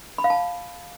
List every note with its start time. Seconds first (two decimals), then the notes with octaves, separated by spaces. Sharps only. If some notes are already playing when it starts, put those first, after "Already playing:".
0.18 B5
0.24 F5
0.30 A5